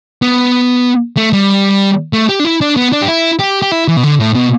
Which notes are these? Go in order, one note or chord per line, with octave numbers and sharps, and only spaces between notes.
B3
A3
G3
A3
G4
D4
E4
D4
B3
D4
G4
E4
G4
G4
E4
E3
B2
D3
A2
B2